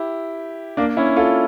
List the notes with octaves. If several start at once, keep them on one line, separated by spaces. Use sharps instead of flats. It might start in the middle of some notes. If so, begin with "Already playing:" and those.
Already playing: E4 G4
A#3 D4
C#4 E4
F4 A4